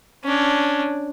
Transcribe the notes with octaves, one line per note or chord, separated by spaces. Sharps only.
C#4 D4